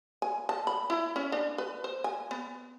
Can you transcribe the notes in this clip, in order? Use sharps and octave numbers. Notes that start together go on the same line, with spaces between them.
G#5
A5
B5
E4
C#4
D4
B4
C5
G#5
B3